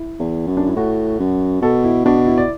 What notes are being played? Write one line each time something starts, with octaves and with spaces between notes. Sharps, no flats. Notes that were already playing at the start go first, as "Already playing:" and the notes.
Already playing: E4
E2
F#2
D4
E4
A2 F#4
F#2
B2 A4
E4
B2 D4
E4
D5